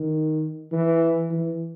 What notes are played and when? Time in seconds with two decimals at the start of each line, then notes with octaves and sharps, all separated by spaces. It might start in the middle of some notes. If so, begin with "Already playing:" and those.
Already playing: D#3
0.72 E3
1.31 E3